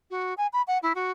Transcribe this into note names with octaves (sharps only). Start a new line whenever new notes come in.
F#4
G#5
B5
F#5
E4
F#4